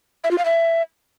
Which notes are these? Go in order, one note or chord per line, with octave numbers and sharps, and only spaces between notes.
E5
F4
F5
E5